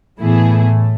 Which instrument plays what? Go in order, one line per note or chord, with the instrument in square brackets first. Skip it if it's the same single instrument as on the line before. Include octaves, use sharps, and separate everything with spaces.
[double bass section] A2 A3 [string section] E3 B3 E4 G#4